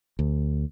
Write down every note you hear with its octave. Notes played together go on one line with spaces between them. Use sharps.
D2